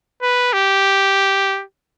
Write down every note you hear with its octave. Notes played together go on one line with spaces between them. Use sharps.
B4
G4